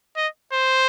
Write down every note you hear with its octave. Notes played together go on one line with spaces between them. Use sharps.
D#5
C5